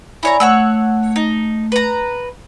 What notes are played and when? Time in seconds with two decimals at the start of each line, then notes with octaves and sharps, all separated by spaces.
0.23 E4 C#5 D5 G#5 A#5 B5
0.40 A3 C#5 F#5 E6
1.16 D#4
1.72 B4 A#5